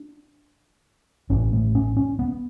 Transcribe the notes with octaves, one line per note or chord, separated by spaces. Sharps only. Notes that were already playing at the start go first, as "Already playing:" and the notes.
Already playing: D4
A1 A2 C#4
A3
C#4
C#4
B3